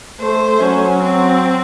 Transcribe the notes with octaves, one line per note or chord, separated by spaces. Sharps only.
A3 C5
F#3 C#4
C4